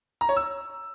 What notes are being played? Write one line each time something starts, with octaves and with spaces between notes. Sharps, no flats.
A#5
C#5
E6